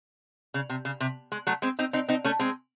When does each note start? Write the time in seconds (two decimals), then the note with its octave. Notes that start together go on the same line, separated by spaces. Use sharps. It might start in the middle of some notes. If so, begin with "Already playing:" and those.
0.54 C#3
0.69 C3
0.85 C#3
1.00 C3
1.32 G#3
1.47 F#3 A3
1.62 G#3 C4
1.79 C4 D#4
1.93 C4 D#4
2.09 C4 D#4
2.24 A3 C#4
2.39 G#3 C4